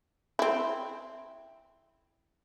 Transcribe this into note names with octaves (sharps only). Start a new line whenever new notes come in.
C4 E4